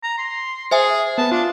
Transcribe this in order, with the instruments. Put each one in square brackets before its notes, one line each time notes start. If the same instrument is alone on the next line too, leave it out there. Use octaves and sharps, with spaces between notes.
[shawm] A#5
C6
[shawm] G#4 [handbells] C5 E5 G#5
[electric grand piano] B3 B4 [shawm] A5
[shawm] D4 [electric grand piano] F4